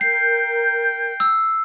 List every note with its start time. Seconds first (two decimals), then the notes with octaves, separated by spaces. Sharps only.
0.01 A#4 G5 G6 C7
1.20 E6